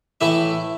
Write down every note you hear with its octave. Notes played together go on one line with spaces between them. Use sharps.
A2 E3 A3 E4 E5